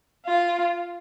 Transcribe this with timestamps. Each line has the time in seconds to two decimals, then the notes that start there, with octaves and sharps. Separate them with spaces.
0.26 F4